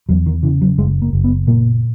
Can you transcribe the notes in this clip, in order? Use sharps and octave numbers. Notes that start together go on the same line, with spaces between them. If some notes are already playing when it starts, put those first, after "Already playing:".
E2 F#3
D#3
C#3 E3
F#3
F#1 G#3
A#3
F#1
B3
A#2 A#3